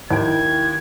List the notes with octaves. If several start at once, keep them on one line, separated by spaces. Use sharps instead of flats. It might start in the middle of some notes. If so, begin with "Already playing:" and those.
D#2 E4 G5 G#6